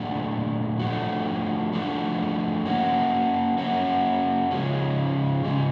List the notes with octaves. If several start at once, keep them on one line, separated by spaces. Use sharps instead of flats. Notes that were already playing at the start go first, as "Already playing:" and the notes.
Already playing: A#2 F#3 A3 D4
F3 A3 D4 F#4
F3 A3 D4 F#4
A#3 C#4 F#4
A#3 C#4 F#4
C#3 F3 G#3 C#4
C#3 F3 G#3 C#4